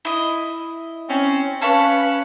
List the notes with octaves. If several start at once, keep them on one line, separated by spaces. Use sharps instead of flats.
E4 D#5
C4 C#4
C#4 B4 F5 A5 B5 C#6